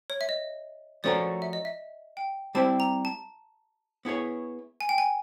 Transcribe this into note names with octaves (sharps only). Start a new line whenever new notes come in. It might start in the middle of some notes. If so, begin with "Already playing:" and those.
C#5
E5
D#5
F3 A3 C#4 F#4 A#4 D5
E5
D#5
E5
G5
G3 C4 E4 G4 A5
A#5
A5
B3 E4 G#4 C#5
G#5
G5
G#5